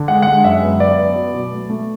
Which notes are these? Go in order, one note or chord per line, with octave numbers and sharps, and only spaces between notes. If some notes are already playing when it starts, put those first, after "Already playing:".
Already playing: D3
G#3 F#5
G#3 F#5
F#2 E5
B3
B3 D5
B3
F#3
B2
A3
A3